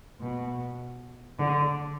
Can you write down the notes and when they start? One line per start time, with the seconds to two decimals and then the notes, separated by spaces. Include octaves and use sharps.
0.21 B2
1.39 D3